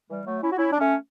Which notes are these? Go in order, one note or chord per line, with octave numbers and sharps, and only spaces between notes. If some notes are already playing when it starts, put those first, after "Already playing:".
E3 G3
F#3 A3
C#4 E4
F#4
C#4 E4
D4
A3 C#4